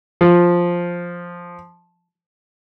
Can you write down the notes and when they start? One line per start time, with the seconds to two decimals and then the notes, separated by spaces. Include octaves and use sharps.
0.21 F3